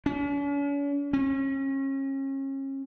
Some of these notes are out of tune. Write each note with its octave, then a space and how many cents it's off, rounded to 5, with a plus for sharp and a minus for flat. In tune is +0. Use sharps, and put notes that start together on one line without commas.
C#4 +45
C#4 -35